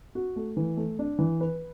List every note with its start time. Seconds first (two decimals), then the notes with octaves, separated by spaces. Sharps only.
0.15 F#4
0.36 A3
0.57 E3
0.77 A3
0.99 D4
1.19 E3
1.41 B4